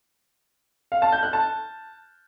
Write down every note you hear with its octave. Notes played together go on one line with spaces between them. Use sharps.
F5
A5
G6
F#6
A5